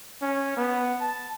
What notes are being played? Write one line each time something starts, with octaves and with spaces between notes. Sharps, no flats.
C#4
B3
A5